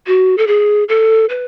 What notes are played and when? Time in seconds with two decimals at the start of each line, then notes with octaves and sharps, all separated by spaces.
0.07 F#4
0.38 A4
0.47 G#4
0.89 A4
1.29 B4